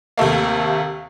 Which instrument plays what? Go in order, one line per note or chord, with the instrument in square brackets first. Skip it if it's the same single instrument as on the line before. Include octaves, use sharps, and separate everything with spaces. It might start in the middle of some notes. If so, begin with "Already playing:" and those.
[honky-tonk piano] D#2 C3 A3 A#3